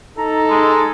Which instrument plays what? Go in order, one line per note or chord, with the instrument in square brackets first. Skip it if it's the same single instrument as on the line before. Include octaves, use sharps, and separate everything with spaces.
[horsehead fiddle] D#4 [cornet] A4 [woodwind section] A#5
[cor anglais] G#3